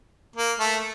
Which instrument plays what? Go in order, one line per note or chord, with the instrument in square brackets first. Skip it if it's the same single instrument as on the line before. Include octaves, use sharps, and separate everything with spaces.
[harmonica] A#3
A3